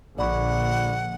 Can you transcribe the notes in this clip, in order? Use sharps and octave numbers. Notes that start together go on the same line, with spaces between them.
A#1 D3 D5 F#5 B5 C#6